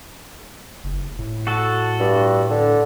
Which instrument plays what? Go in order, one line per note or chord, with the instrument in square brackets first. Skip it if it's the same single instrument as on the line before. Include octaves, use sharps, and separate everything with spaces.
[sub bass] F#1
A2
[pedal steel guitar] F#4 A4
[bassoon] G2
D3